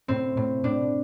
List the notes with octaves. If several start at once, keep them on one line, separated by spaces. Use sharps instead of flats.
A2 C4
A2
A2 D4